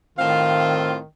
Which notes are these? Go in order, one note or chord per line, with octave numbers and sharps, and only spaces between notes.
A2 D#3 C4 F4 F5